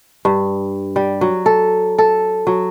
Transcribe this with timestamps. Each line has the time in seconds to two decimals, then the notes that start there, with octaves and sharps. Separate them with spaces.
0.25 G2
0.96 G3
1.21 F#3
1.46 A4
1.98 A4
2.47 F#3